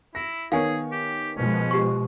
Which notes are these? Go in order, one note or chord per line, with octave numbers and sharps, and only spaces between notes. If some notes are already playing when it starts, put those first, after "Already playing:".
E4 A#6
D#3 B3 G#4 C#5 F5 G#5
G4
B2 F3 G#3 C#4
G4 C#6